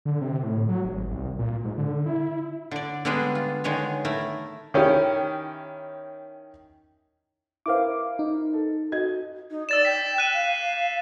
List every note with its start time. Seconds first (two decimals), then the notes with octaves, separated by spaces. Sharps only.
0.05 D3
0.21 C3
0.43 A2
0.69 F#3
0.85 G#1
1.11 C2
1.39 A#2
1.64 G#2
1.78 D3
2.06 E4
2.71 D3 D5
3.05 D3 G3 G#3 B3 D4 G#4
3.35 F4
3.64 D3 D#3 G#3 G#4 C#5
4.05 A3 E4 A#4
4.74 D#3 C#4 E4 G4
7.66 E4 A#4 C5 F5 D6
8.19 D#4
8.53 A4
8.92 F#4 D#5 G#6
9.51 D#4
9.69 D5 E6 A6 E7
9.85 G5 B6
10.18 F#6 D#7
10.33 F5